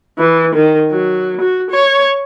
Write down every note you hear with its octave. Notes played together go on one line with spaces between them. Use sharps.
E3
D#3
F#3
F#4
C#5